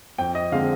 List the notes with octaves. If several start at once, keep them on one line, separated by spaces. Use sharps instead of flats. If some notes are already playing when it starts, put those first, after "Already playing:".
F2 G5
D#5
D3 G#3 C4 F5